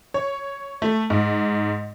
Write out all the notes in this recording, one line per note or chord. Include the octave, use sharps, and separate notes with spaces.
C#5
A3
G#2